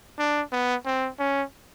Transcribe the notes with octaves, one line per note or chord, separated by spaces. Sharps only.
D4
B3
C4
C#4